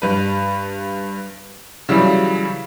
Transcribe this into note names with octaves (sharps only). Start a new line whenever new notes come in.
G2 B4
C#3 E3 F#3 G3